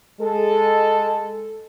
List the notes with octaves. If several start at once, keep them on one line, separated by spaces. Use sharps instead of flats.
G#3 A4